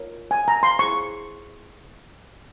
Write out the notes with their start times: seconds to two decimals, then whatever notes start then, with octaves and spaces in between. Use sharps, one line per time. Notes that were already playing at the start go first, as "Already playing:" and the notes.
Already playing: F4 A#4 C#5
0.31 G#5
0.48 A#5
0.63 C6
0.79 E4 G#4 C5 C#6